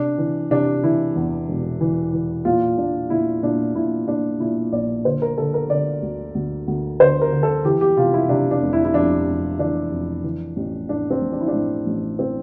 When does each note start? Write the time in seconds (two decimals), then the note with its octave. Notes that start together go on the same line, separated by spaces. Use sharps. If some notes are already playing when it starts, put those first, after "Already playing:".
Already playing: C3 D4
0.18 E3
0.51 C3 D4
0.83 E3 E4
1.16 E2
1.48 E1
1.81 E3
2.13 E3
2.45 A#2 F4
2.78 A#2 D4
3.10 A#2 E4
3.43 A#2 D4
3.75 A#2 E4
4.07 A#2 D4
4.40 A#2 E4
4.73 A#1 D5
5.05 D3 C5
5.22 A#4
5.37 D3 A4
5.54 A#4
5.70 D3 D5
6.02 D2
6.35 D2
6.68 D2
7.00 D3 C5
7.22 A#4
7.32 D3
7.43 A4
7.65 E3 G4
7.81 G4
7.97 C3 F4
8.13 E4
8.29 C3 D4
8.51 D4
8.62 F1
8.73 E4
8.84 E4
8.94 F2 D4
9.27 F2
9.59 E3 D4
9.92 F2
10.24 E3
10.56 A1
10.89 A2 D4
11.11 C4
11.21 A1
11.32 D4
11.40 E4
11.48 D4
11.54 A2
11.86 A1
12.19 E3 C4